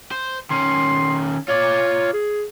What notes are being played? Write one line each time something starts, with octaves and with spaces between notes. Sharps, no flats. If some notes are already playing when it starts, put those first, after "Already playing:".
C5
D#3 C#4 C6
F4 C#5 D5
G#4